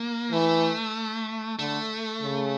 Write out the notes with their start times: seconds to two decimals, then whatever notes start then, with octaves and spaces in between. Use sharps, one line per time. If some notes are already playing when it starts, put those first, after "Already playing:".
Already playing: A#3
0.32 E3 A3
1.59 D3 A3
2.22 C#3